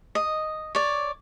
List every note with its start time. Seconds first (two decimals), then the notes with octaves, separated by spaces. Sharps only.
0.15 D#5
0.75 C#5 D5